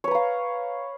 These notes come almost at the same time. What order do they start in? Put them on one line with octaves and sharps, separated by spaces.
C#5 B4 A#5 F5